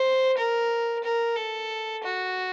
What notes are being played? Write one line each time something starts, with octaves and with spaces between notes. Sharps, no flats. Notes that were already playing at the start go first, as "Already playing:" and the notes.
Already playing: C5
A#4
A#4
A4
F#4